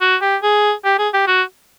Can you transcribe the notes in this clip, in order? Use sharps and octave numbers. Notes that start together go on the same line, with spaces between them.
F#4
G4
G#4
G4
G#4
G4
F#4